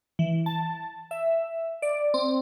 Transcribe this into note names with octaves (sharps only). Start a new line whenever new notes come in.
E3
A5
E5
D5
C4